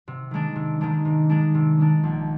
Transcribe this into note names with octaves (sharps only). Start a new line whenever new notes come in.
C3
D#3 G#3 D4
C3
D#3 G#3 D4
C3
D#3 G#3 D4
C3
D#3 G#3 D4
A#1